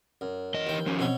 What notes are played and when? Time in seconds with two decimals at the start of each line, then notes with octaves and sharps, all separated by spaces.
0.21 F#2
0.54 E3 D#5
0.67 D#2 G5
0.86 F3 C#4
0.99 B2 C4 C#5